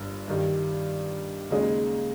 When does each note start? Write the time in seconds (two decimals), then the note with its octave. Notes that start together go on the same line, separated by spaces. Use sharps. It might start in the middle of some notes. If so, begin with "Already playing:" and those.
Already playing: G1 G2 A#3
0.28 G2 D#3 G3
1.50 D#2 C#3 G#3 D#4 G#4